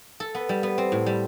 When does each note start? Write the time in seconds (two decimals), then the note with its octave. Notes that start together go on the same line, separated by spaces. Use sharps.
0.20 A4
0.35 B3
0.49 G3
0.63 B3
0.78 C4
0.92 A2
1.06 G3